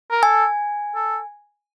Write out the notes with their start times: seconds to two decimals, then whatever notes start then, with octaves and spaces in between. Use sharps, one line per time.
0.11 A#4
0.23 A4 G#5
0.96 A4